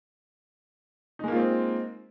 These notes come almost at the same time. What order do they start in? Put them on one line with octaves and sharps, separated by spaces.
D#4 G#3 A#3 F4 C4